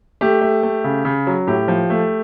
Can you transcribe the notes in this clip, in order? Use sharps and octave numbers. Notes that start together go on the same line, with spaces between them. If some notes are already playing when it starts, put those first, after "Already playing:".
A3 G4
A3
A3
C#3
C#3
F#3
A2 G4
F3
A3